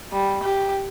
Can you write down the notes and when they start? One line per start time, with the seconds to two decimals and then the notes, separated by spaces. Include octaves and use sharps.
0.13 G3
0.43 G4